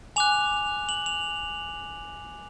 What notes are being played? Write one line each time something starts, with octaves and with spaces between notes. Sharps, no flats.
G#5 D6 F#6 F7
F#7
F7